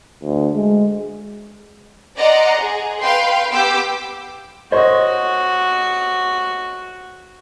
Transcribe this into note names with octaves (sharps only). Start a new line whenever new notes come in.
D2
G#3
D5 D#5 F#5 A#5 C6
G#4
B4 F5 G5 C6
B3 G4 D6 E6 G6
F#4 C5 C#5 D#5